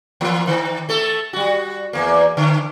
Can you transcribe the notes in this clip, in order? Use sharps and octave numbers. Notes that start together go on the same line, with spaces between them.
E3 A#3
D#3
A3 A4
G3 F#4
E2 A#3
D3